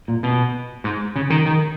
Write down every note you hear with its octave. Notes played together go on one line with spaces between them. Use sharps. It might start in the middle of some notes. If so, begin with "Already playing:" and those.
A#2
B2
G#2
C#3
D#3
D#3